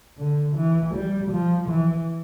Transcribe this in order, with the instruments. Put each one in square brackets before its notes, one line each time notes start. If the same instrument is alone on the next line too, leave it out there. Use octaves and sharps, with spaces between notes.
[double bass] D3
E3
G3
F3
E3